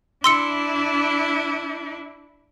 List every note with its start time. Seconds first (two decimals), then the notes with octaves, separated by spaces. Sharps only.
0.24 D4 E4 C6 E6 C#7